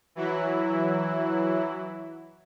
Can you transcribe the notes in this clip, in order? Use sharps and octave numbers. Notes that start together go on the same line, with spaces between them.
E3 F#3 E4